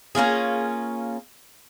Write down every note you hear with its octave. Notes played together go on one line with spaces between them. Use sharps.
A#3 C#4 F4 G#4